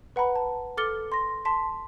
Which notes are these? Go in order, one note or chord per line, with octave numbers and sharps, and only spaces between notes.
B4 F#5 A#5 B5
A5
A4 D6 F6 A6 C#7 G7
C6 A#6
A5 C6 B6